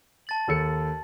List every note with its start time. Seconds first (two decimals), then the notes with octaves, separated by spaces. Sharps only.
0.27 A5 A6 F#7
0.48 D#2 A4 C#7